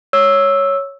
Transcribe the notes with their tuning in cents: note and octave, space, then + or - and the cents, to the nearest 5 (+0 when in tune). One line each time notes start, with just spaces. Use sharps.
C#5 +0 E6 +0